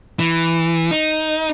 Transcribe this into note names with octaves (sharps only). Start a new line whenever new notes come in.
E3
D#4